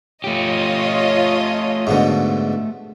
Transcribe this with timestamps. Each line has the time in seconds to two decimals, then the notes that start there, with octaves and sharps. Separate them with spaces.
0.24 A3 F4 G4 C#5 D#5
1.87 G#2 B2 D3